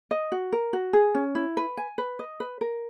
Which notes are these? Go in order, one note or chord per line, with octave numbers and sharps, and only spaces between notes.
D#5
F#4
A#4
F#4
G#4
C#4
E4
B4
G#5
B4
D#5
B4
A#4